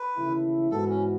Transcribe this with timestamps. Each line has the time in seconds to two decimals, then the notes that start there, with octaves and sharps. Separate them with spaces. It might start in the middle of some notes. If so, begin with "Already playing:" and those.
Already playing: B4
0.17 D#2 C#3 E3 A3 E4
0.71 G#2 E3 B3 F#4 A4
0.90 C#4